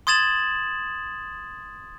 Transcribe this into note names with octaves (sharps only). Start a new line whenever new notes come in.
C6 D#6 G#6 A6 E7 F#7